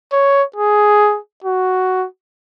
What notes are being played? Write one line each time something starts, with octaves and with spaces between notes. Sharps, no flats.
C#5
G#4
F#4